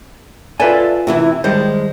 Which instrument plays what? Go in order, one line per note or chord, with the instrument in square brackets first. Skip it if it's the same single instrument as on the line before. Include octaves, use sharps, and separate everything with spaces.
[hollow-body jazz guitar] F4 B4 G#5 [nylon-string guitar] A4 D5 E5
[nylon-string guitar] C3 E3 E4
[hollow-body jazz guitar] D#3 G3 C5 [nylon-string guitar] G#3